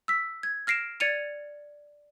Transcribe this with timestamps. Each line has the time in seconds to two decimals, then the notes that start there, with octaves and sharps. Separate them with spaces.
0.08 E6 B6
0.43 G#6
0.67 F6 A#6 C7 D7 E7
1.00 D5 G#6 A6 C#7 D#7 F7